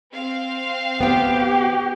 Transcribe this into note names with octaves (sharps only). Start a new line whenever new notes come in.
C4 F5
B3 G4 G5